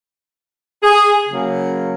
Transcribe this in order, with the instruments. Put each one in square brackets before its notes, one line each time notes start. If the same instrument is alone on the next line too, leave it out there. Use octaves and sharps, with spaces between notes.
[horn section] G#4
C#3 F#3 A#3